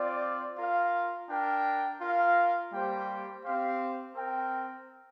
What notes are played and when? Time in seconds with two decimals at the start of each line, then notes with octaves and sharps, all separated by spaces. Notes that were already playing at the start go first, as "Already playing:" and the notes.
Already playing: C4 F4 D5
0.58 F4 A#4 F5
1.30 D4 A#4 G5
2.01 F4 A#4 F5
2.72 G3 A#3 G4 C5 G5
3.44 C4 G4 C5 F5
4.15 C4 A#4 G5